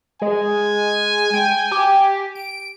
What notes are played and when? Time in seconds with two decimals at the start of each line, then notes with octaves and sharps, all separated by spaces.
0.21 G#3 G#5
1.33 G5
1.71 G4
2.35 D7